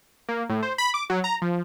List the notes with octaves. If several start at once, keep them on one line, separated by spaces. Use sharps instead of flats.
A#3
A2
C5
B5
D6
F#3
A#5
F3